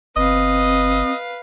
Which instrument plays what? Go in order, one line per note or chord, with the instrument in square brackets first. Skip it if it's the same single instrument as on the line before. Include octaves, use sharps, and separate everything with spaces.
[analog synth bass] G1 [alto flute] C4 [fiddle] B4 F5 [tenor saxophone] D#5